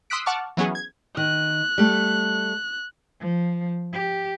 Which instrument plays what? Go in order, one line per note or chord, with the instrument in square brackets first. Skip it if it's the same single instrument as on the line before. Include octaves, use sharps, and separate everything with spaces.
[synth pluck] C6 D#6 E6 F#6 B6 D7
F#5 A5 C#6 D6 F6
E3 F#3 B3 C#4 G#4
G#6
[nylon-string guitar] D#3 [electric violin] F#6
[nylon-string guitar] G3 A3
[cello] F3
G4